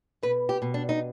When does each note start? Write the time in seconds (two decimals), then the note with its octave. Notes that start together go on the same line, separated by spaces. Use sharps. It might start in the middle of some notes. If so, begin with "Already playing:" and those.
0.23 B2 B4
0.49 G4
0.62 B2
0.74 D4
0.89 D#4